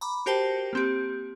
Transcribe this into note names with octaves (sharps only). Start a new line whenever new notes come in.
A#5 B5 D6
F#4 G4 A#4 C5 G5 A5
A#3 C4 G4